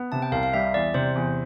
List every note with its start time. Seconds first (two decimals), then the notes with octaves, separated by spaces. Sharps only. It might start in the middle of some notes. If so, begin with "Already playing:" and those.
Already playing: B3
0.12 C3 A5
0.22 G5
0.32 C2 F5
0.43 F5
0.54 G3 E5
0.74 E2 D5
0.94 C3 C5
1.15 E2